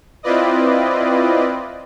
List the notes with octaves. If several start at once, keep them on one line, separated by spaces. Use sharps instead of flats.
C4 E4 F4 B4 D5 D#5